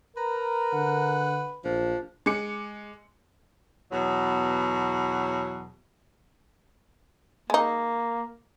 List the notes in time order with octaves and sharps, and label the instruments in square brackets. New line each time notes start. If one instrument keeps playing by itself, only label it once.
[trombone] A#4 [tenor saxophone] B4 [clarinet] A#5
[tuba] D3 [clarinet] F#5
[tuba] A#1 [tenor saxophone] F3 [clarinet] D4
[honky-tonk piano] G#3 G#5 D6 C#7
[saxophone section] E2 B2 F#3
[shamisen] G#3 D#4 [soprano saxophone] A#3